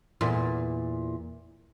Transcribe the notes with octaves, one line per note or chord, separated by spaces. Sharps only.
E2 A#2